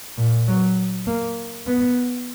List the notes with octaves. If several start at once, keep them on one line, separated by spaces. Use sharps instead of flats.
A#2
F#3
A#3
B3